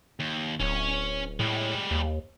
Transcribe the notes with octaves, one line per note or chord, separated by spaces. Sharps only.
D#2
D1 C#4 C#5
A2 G3 G#3
D#2